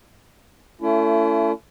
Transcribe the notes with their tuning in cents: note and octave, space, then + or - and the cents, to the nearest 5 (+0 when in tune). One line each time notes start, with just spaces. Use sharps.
A3 +30 C#4 +45 E4 +40